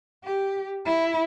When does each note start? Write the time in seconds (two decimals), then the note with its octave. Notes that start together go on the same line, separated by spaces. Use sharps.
0.24 G4
0.85 E4